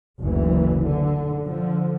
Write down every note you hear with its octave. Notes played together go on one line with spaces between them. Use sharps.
F#1 D2 E3
D3
D3 F3